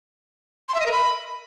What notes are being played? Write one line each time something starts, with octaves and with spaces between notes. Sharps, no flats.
C6
E5
D#5
A#4
B5